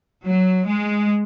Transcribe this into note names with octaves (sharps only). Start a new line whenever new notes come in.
F#3
G#3